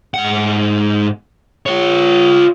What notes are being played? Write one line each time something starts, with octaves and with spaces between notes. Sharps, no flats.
G#2 F#5
F4 C#5